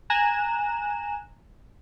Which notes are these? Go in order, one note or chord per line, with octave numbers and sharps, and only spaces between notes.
G#5 A#5 F#6 E7